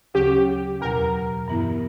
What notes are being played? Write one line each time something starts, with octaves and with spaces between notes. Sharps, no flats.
D2 C#3 F#3 C#4 G4
E2 B2 F#3 A#4
G2 E3 B3 E4